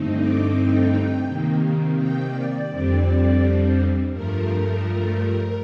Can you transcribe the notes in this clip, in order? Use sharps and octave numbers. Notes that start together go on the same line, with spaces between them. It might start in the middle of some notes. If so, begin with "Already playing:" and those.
Already playing: G2 D3 A3 C4 D#4
D6
G5
G5
C3 D#3 A#3
G5
D5
F2 D3 G3 C4 D5
G2 F3 A3 A#4